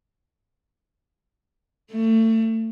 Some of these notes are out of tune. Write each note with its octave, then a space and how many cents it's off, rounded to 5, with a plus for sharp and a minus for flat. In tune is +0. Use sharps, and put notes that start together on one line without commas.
A3 +30